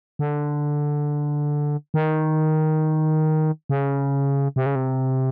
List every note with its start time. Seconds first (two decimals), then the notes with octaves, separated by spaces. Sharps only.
0.19 D3
1.94 D#3
3.69 C#3
4.56 C3
4.66 C#3
4.75 C3